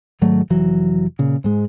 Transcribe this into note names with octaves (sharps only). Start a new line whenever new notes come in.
G#2 D#3 F#3 A3
F1 E3 F#3
A#2 C#3
G#2 G#3